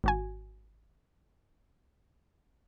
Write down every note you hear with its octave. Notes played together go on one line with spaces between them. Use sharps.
G#1 F#4 G#5